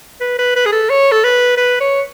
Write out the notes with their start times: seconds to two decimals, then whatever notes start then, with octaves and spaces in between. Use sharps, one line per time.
0.21 B4
0.39 B4
0.56 B4
0.66 G#4
0.72 A4
0.90 C#5
1.12 A4
1.24 B4
1.57 B4
1.81 C#5